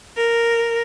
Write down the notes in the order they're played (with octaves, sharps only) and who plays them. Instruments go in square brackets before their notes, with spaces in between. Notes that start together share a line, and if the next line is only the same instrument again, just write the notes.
[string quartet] A#4